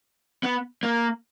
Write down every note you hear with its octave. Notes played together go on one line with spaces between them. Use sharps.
B3
A#3